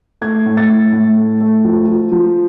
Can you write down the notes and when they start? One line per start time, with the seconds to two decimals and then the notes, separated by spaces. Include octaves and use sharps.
0.21 A3 G#6
0.46 A2
0.57 A6
0.69 A2
0.92 A2
1.17 A3
1.41 A3
1.65 F3
1.88 F3
2.12 F3